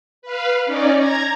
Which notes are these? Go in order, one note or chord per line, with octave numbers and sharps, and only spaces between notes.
B4 F5
C#4 D#4 D5
A#5 G#6